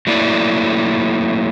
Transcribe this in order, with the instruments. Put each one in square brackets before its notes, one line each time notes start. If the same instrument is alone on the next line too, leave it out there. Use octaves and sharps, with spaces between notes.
[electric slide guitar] F#3 A3 A#3 E4 D5